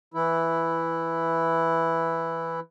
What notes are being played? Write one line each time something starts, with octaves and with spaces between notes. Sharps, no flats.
E3 E4